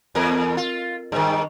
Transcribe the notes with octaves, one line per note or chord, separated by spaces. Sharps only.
E2 A#4
F4
G2 D#3